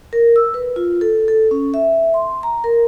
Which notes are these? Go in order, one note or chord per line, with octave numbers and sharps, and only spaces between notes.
A#4
E6
B4
F4
A4
A4
C#4
E5
C6
A#5
A#4